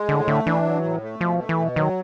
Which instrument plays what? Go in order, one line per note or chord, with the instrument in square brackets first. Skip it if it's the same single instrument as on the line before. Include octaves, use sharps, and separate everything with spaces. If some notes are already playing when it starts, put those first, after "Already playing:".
Already playing: [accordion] G#3
[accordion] A2 [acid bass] D3
[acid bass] D3 [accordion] A3
[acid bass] E3 [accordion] D4
[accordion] F#3
A2
A3
[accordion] B2 [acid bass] F3
[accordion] A3
[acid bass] E3
[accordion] B2
[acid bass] D#3 [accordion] F#3